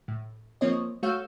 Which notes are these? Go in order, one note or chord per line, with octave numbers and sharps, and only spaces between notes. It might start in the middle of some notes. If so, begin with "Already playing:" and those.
A2
F3 A#3 C4 C#5 D#5
A3 F#4 C#5 F5 E6 G6